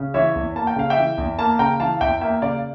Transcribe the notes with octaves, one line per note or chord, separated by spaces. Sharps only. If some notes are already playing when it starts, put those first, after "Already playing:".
Already playing: C#3
E3 C#5 E5
E2
A#3 A5
G5
C#3 F5
E5 G5
E3
E2
A#3 F5 A5
C#3 G5 A#5
E3 F5 A5
E2 E5 G5
A#3 E5 G5
C#3 D5 F5